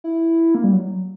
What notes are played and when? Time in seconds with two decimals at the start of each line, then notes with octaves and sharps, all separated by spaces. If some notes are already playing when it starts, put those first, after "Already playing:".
0.04 E4
0.55 A#3
0.64 G3
0.73 F#3